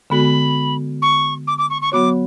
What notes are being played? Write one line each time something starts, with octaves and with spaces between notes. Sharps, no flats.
D3 G#3 B3 F#4 A4 B5
C#6
D6
D6
C#6
C#6
F#3 B3 F#4 C#5 D6